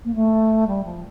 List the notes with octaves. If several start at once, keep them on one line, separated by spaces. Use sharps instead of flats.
A#3
A3
G3
F3